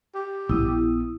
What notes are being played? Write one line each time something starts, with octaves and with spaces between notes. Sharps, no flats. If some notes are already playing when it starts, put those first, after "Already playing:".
G4
A#1 B3 E4 D#6